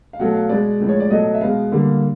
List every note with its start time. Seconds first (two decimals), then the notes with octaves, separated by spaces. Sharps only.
0.13 F5
0.19 B2 F#3 A3 F#5
0.35 F5
0.49 B2 G#3 B3 D5
0.80 A2 F3 G#3
0.89 C#5
1.00 D5
1.10 B2 F#3 A3 D#5
1.34 E5
1.41 B2 G#3 B3 F5
1.72 D3 G3 A#3